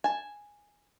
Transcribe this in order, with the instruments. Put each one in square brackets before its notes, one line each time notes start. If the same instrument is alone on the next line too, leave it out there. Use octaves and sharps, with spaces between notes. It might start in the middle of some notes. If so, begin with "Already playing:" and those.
[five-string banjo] G#5 A5